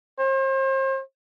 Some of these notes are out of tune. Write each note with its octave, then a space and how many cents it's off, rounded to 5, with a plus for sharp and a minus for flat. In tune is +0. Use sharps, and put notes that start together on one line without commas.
C5 +40